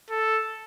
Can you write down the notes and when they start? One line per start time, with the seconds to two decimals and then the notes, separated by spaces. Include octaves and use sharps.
0.10 A4